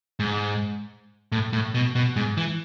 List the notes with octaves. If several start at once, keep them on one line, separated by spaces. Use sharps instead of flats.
G#2
A2
A2
B2
B2
G#2
E3